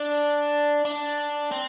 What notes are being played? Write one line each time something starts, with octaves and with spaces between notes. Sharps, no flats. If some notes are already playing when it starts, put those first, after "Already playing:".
Already playing: D4
D4
C4